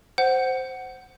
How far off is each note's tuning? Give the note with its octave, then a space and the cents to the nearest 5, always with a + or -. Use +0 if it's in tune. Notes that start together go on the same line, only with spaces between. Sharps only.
C5 +0 F#5 +15